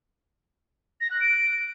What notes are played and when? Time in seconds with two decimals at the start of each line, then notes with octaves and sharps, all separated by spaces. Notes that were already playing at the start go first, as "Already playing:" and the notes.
1.01 A#6
1.11 F#6
1.20 D7